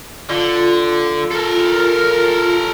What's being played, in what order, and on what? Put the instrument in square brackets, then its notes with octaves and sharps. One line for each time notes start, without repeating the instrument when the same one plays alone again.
[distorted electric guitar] D3 [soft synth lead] F4
[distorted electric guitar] A4 A#4